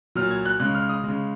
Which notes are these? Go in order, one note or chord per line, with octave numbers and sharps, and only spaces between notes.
A#2 F#3 F6
G#6
F#6
C#3 G#3 F#6
F6
D#6
C#3 G#3